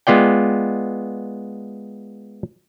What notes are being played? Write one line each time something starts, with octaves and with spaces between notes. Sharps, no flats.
G#3 B3 F4 D5 G5